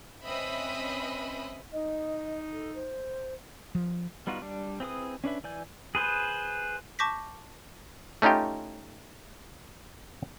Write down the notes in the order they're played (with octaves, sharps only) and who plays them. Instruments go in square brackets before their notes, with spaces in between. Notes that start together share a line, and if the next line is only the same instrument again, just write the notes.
[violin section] C4 C#4 B4 D#5 E5 B5
[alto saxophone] D#4 [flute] D#5
[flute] A4
C5
[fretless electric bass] F3
[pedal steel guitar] G3 B3 D#4 F4 F#4
G3 D4
C4 E4 G#4 B4 D#6
C#4 D4 B4 E5
E3 D5 G#5 G6
G#4 B4 C5
[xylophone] A5 C#6 D6 G6 A#6 B6
[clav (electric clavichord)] A3 C#4 D#4 F4 G4